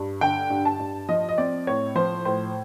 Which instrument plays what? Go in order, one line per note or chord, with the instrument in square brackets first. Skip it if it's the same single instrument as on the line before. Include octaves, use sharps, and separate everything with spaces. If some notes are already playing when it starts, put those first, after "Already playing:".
Already playing: [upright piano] G2
D3 G5
G2
A5
G2
F3 D#5
D#5
C4 D5
A2 C#5
F3 C5
A2 C5